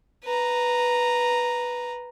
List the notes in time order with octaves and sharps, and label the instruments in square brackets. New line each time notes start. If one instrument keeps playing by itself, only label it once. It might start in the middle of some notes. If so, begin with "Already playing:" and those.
[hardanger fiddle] B4 A#5